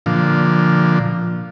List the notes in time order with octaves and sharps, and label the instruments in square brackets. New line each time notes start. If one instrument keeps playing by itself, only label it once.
[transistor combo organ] A#2 D3 F3